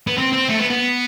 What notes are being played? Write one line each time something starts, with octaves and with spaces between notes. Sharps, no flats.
B3
C4
C4
A3
B3
B3